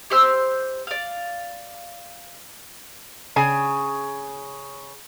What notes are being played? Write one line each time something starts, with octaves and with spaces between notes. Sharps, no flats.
G4 C5 E6
D5 F5
C#3 G#4 G#5